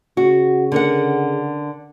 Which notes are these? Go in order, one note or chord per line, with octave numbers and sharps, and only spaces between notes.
C#3 F#4
D3 A#4 F#5